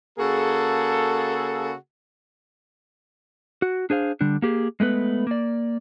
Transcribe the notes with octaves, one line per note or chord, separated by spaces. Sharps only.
C#3 A#3 F#4 G#4 A4
F#4
D4 G#4 C5 F5
D3 G3 D4
A#3 G4 G#4
G#3 A3 B3 B4
A#3 D5